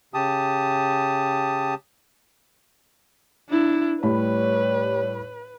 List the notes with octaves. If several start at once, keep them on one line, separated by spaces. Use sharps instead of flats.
C#3 G4 A5 D#6
D4 E4
A2 G3 G4 B4 C#5 B5